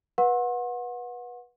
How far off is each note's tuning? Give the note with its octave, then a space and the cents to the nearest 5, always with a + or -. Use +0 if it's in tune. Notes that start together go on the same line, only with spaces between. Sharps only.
B4 -20 F#5 -25 C6 +40